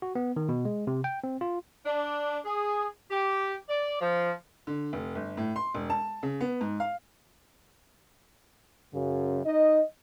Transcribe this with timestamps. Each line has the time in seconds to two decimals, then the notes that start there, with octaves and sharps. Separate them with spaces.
0.02 F#4
0.15 B3
0.36 D#3
0.49 B2
0.65 G#3
0.87 C3
1.04 G5
1.24 C4
1.41 F4
1.86 D4
2.45 G#4
3.11 G4
3.69 D5
4.01 F3
4.67 D3
4.93 F1
5.15 G1
5.37 A2
5.56 C6
5.74 E1
5.90 A5
6.23 C#3
6.41 B3
6.61 G#2
6.80 F5
8.94 F#2 C#3
9.45 D#4 D#5